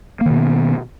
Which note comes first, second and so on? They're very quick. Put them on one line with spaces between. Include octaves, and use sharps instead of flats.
A#3 D#3 B2 B3